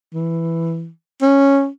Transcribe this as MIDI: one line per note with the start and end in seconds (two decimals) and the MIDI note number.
0.14 0.89 52
1.22 1.68 61